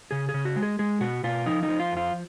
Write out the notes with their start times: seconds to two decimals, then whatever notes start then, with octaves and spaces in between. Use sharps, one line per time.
0.11 C#3 G#4
0.29 G#4
0.34 C#3
0.45 F#4
0.56 G#3
0.63 G#4
0.79 G#3 G#4
1.01 B2 F#4
1.24 B2 F4
1.46 F3 D#4
1.63 D#4
1.68 F3
1.80 F4
1.92 F2 F4